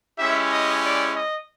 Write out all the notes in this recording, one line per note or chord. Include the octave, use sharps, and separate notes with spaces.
G#3 C#4 E4 G4 E5
D#5
D5
D#5